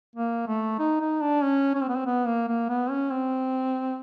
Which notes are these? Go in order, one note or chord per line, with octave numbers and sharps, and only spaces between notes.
A#3
A3
D#4
D#4
D4
C#4
C#4
C4
B3
C4
B3
A#3
A#3
B3
C#4
C4